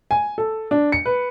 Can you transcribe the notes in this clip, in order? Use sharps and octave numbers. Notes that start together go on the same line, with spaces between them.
G#5
A4
D4
C#7
B4